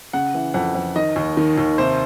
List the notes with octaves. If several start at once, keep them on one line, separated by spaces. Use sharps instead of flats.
C#3 F#5
E3
F2 F#5
F2
D#3 D#5
D#2
D#3
D#2
C3 C5